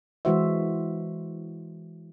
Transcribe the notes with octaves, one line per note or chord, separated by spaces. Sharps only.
E3 G#3 E4 F#4 C5 E5